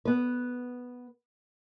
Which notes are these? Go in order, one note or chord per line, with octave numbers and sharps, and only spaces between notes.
B3 B4